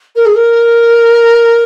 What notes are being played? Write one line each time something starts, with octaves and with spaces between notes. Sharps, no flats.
A#4
G#4
A#4